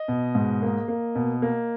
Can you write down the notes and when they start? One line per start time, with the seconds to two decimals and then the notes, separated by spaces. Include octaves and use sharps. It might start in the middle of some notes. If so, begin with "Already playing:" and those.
Already playing: D#5
0.08 B2
0.35 G#2
0.62 A#3
0.88 A#3
1.15 B2
1.42 A#3